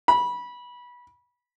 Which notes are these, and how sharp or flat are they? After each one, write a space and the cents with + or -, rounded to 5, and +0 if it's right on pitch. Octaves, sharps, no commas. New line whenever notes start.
B5 -20